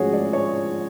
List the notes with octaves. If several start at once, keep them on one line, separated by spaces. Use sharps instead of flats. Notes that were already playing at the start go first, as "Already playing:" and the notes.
Already playing: G#2 F3 C#4 F#4 G#4 C#5
D5
C#5